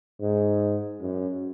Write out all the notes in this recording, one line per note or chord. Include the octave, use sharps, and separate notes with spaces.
G#2
F#2